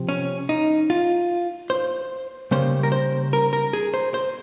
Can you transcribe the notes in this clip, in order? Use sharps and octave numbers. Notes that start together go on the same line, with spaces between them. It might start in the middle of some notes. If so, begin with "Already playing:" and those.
Already playing: C3 F3 C4
C#4
D#4
F4
C5
C#3 G3 A#3 C#4 C5
A#4
C5
A#4
A#4
G#4
C5
C5